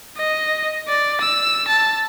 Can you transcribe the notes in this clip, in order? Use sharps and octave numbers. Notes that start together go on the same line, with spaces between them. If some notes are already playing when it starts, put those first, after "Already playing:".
D#5
D5
E6
A5